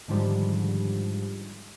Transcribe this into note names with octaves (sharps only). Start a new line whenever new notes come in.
G#2 D3 D#3 F3 G3 G#3